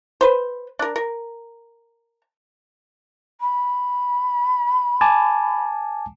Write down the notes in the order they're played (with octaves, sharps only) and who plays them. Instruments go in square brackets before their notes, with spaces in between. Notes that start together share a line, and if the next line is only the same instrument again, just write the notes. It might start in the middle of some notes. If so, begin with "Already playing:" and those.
[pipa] B4 C5
D4 A#4
A#4
[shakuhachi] B5
[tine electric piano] G#5 A5 D6